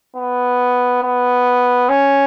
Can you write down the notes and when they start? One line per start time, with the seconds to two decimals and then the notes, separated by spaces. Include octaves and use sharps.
0.16 B3
1.03 B3
1.89 C#4